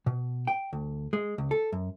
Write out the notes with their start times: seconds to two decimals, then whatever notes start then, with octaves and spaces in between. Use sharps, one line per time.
0.06 B2
0.47 G5
0.73 D2
1.13 G#3
1.38 C#2
1.51 A4
1.72 F#2